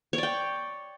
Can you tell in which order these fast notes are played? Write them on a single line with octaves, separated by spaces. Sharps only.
C#5 D5 G5